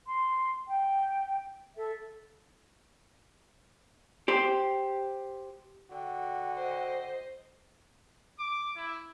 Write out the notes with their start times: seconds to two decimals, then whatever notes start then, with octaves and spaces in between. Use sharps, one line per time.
0.05 C6
0.66 G5
1.76 A4 E5
4.28 G4 C5
5.91 D3 F#4 G5
6.56 C5 D#5
8.39 D6
8.76 E4